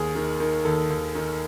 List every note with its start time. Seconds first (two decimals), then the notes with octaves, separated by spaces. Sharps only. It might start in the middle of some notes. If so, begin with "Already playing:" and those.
Already playing: D#2 G#4
0.15 D#3
0.40 D#3
0.65 D#2 A4
0.90 D#2
1.15 D#3